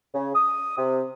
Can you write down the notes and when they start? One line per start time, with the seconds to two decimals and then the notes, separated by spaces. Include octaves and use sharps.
0.14 C#3
0.35 D#6
0.77 C3